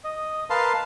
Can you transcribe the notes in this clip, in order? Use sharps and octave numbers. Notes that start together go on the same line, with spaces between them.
D#5
A#4 B4 F5 A5 C6